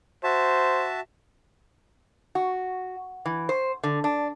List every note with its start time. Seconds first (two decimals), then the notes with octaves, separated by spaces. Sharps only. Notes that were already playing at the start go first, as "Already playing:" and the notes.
0.24 F#4 C5 E5 A5
2.35 F#4
3.26 E3
3.49 C5
3.83 D3
4.04 D4